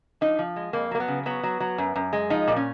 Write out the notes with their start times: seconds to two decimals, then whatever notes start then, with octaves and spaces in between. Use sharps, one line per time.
0.21 F3 D#4
0.39 F3
0.56 G#3
0.73 F2 A#3
0.91 F#3 A#3
1.00 B3
1.08 C#3
1.26 F#3 B3
1.43 F#3
1.60 F#3
1.78 F#2
1.96 F#2
2.13 G#3
2.30 F3 D#4
2.47 A#2
2.56 C#4